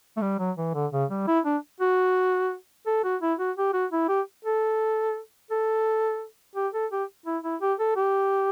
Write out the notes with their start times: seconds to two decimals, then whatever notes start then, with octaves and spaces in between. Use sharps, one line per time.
0.17 A3
0.22 G3
0.39 F#3
0.57 E3
0.74 D3
0.93 C#3
1.10 G3
1.28 E4
1.45 D4
1.81 F#4
2.87 A4
3.04 F#4
3.22 E4
3.39 F#4
3.57 G4
3.73 F#4
3.92 E4
4.09 G4
4.45 A4
5.51 A4
6.55 G4
6.74 A4
6.91 G4
7.26 E4
7.44 E4
7.62 G4
7.80 A4
7.96 G4